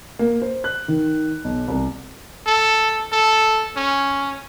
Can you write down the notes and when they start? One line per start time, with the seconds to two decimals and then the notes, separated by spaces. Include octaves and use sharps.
0.19 A#3
0.42 C5
0.64 F#6
0.88 D#3
1.44 B1
1.68 C2
2.47 A4
3.12 A4
3.76 C#4